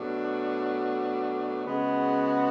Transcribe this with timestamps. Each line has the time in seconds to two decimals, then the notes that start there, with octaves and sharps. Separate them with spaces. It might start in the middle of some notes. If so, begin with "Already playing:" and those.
Already playing: B2 F#3 A3 D4
1.64 C#3 G#3 B3 F#4